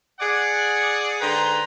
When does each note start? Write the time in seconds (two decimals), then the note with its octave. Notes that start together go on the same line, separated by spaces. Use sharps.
0.20 G#4 D5 F#5
1.20 G#2 D3 B4 G5 A#5 C6